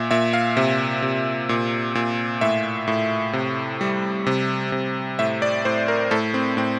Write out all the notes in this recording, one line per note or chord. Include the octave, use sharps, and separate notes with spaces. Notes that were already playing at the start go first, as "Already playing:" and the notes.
Already playing: A#2 E5
A#2 E5
F5
C3 E5
C3
A#2
A#2
A2 E5
A2
C3
G3
C3
C3
A2 E5
D5
A2 C5
A#4
A2 A4
C4
A2 C4